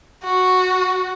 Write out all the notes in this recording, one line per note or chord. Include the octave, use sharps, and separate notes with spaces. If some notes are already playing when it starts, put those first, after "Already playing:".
F#4